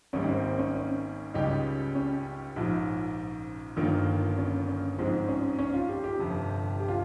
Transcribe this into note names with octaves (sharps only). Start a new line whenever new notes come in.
G#1 G#2 G3 A#3 C#4
C4
C4
C#4
C#4
C#2 C#3 G3 C#4 D#4 G4
C#4
A#1 G#2 F3
G1 G2 D#3 A#3 F4
C#4
C#4
G#2 F3 G#3 C4
C#4
C#4
F4
G4
G4
G1 F2 C3
G4
F4